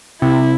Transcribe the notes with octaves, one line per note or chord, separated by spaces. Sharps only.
C3 E4